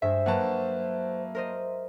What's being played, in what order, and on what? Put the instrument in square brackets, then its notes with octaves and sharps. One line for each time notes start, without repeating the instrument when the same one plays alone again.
[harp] G2 G#3 [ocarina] C5 [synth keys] E5
[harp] F#3 F#5 [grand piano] A#3 B4 A5
[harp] A#4 C5 D#5